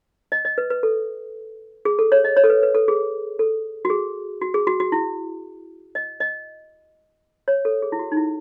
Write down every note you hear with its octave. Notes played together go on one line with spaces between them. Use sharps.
D#5
D#5
B4
B4
A4
G#4
A4
C#5
D#5
C#5
A4
B4
B4
A4
G#4
A4
F#4
G#4
F#4
G#4
F#4
F#4
E4
D#5
D#5
C#5
A4
G#4
E4
F#4
D#4
E4